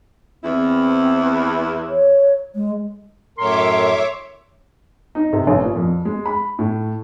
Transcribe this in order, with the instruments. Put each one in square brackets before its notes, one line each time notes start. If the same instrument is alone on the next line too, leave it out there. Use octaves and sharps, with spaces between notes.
[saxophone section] E2 E4 [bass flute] C4
[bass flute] C#5
G#3
[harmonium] F#2 A2 A#4 [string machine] C#5 E5 D6 [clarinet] C6
[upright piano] D#4
C3
A1
A#2
F2
G#3
B5
A2